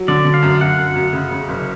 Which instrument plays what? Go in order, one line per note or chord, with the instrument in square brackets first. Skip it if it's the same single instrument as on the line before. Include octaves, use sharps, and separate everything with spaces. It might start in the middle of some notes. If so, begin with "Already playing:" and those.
Already playing: [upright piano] F#3
[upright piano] D3 [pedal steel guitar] D5
[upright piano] D3
[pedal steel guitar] F5
[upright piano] F#2
[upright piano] F#2 [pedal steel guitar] F#5
[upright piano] F#2
F#2
C#3
C#3
F#1